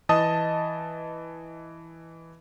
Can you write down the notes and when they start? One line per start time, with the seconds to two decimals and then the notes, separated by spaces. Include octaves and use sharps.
0.09 E3 D#5 A5 D#6